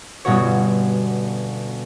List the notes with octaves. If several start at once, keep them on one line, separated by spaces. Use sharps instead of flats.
G1 G2 B2 C#4 F#4 C#5